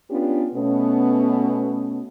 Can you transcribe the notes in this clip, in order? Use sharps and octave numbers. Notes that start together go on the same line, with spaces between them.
B3 C#4 D4 F4 G4
B2 A3 B3 C#4